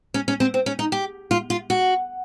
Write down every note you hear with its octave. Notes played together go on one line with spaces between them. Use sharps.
C#4
C#4
C4
C4
C#4
D#4
G4
F4
F4
F#4